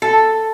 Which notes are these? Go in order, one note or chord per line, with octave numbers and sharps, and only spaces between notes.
A4